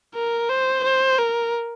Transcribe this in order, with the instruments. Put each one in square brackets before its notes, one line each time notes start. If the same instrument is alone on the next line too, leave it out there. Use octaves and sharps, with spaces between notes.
[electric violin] A#4
C5
C5
A#4